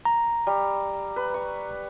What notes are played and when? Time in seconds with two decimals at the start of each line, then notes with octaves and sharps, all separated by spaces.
0.05 A#5
0.47 G3
1.16 B4
1.34 C#6